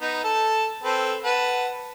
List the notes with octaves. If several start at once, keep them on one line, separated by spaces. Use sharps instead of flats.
B3 D#4
A4 A5
C4 A4 B4
B4 F#5 A5